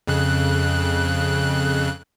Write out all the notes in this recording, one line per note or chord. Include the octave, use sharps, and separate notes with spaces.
F2 C#3 F#6